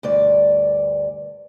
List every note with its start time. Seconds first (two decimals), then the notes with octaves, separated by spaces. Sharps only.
0.03 D2 G2 D5